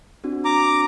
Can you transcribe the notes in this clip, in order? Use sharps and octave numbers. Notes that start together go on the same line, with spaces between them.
C4 D4 F#4
A#5 D6